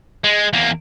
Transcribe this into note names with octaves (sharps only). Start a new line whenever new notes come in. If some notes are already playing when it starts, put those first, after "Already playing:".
G#3
E2 A#3